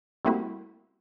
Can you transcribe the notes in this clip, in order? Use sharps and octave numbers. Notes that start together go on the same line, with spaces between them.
G3 A3 A#3 C4 E4 F#4